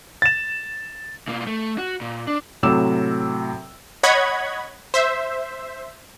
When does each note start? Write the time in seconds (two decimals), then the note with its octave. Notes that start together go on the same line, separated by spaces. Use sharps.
0.22 A6 E7
1.28 B2 A#3
1.47 A3
1.78 F#4
2.01 A#2
2.27 D4
2.63 A2 C3 F#3 D6 E6 E7
4.03 C#5 D#5 F#5 B5 G#6
4.94 C5 E5